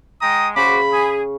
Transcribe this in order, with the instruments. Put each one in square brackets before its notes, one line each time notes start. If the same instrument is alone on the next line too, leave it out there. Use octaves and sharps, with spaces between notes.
[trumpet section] G#3 G5 D#6 [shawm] A#5
[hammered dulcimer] C#3 [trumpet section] F#4 C5 D6 [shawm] B5
[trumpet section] G#4